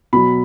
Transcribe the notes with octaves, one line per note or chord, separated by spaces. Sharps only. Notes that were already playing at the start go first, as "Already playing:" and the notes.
B2 F#3 B5